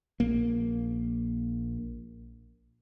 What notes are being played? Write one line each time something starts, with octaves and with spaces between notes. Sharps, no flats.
A#1 A#3